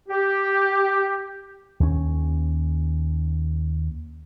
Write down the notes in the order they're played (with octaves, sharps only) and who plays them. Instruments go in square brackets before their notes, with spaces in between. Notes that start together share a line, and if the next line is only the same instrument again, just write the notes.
[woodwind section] G4
[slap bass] D#2 C#4